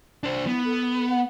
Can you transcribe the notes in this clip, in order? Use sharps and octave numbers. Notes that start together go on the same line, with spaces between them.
D4 C5
B3 E4
A4
F#5